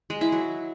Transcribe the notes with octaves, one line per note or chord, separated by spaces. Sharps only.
G#3
E4
F#3